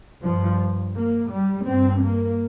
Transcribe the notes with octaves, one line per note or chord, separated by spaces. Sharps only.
G2 F3
A#3
G3
G2 C4
A#3